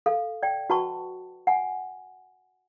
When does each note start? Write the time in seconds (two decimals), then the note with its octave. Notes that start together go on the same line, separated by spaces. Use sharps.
0.06 A4 F5
0.43 D5 G5
0.70 F#4 B4 F#5 A5 B5 C#6
1.47 F#5 G#5